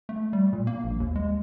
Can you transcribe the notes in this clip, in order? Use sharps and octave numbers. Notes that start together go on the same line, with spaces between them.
A3
G3
A#2
A#3
A#1
D#2
G#3